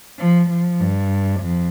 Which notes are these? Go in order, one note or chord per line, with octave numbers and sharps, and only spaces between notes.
F3
F3
G2
F2